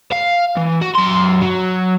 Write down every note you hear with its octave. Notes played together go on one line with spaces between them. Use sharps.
F5
E3
F#4
F#2 C6
F#3